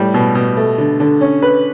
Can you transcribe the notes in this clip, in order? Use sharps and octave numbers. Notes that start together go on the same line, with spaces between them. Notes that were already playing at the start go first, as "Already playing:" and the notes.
Already playing: A2 G3
B2
B2
A3
D3
D3
C#4
B4